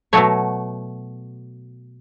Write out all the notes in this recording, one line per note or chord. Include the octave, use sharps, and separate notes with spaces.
B2 F#3 A3 C#5